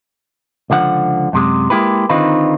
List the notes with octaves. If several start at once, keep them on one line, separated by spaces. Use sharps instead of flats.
C#2 D3 F3 F#5
F#2 C3 G#3
G#3 A#3 E4 G4 B4
D3 D#3 C4 D#4 F4 B4